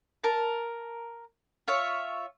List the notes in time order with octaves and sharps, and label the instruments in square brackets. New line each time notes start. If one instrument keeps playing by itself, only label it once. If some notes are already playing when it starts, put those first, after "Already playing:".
[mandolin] A#4 A5
F4 C#5 E5